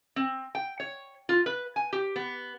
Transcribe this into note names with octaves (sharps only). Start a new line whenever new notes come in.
C4
G5
C#5
F4
B4
G#5
G4
B3